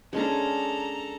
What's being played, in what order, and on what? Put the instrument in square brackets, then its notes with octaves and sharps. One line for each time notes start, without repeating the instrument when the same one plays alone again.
[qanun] G#3 C#4 D4 [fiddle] A4 A#5